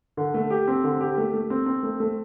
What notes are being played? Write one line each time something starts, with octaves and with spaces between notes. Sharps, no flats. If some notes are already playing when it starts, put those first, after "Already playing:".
D3
A3
G4
C4
D3
G4
A3
A3
C4
C4
A3
A3